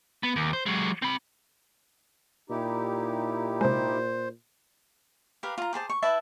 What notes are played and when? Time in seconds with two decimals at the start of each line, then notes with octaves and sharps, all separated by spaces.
0.23 B3
0.36 D#2
0.53 C5
0.66 F#3 G#3
1.02 C4 B5
2.50 A#2 D#4 E4 G4
3.61 C3 G#3 C5
5.43 G4 A#4 B4 F5
5.58 F4 A#5
5.73 G4 G#4 C5 A5
5.90 C#6
6.02 E4 B4 E5 A5